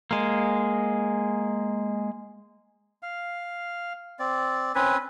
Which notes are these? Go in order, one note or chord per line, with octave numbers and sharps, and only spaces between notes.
G#3 A#3
F5
C4 D5
C4 C#4 B4 G#5